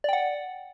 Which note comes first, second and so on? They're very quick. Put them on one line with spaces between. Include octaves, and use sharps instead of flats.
D5 G5 F#5